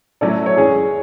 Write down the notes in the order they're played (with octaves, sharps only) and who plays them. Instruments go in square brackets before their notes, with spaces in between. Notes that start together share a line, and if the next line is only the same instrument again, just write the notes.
[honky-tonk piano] F#3 A3 C#4 E4 A4 [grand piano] D5
[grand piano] C#5
[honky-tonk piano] E3 G#3 C#4 [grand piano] G#4